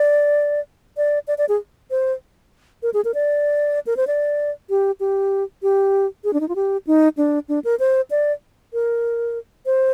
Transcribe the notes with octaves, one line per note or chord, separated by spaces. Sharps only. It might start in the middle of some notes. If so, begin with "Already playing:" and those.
Already playing: D5
D5
D5
D5
G#4
C5
A#4
G#4
A#4
D5
A#4
C5
D5
G4
G4
G4
G#4
D4
D#4
F4
G4
D#4
D4
D4
A#4
C5
D5
A#4
C5